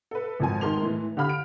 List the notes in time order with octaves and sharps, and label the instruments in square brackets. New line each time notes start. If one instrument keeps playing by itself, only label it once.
[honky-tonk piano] A4 B4
G#1 F2 G#5
D#3 G#3 A#4 C6 F7
A2 E3
D3 G4 F5 B5 F6
D7